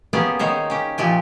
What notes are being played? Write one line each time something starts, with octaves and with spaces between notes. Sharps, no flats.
A#3 B3 C#4 G4 G#4
D#3 D#4 C5 C#5
C#4 G4
A#2 F3 G4 G#5